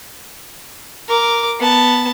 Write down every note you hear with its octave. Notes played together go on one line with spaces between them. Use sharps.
A#4 D6
B3 A5